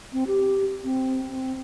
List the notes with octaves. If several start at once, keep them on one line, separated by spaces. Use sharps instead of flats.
C4
G4
C4
C4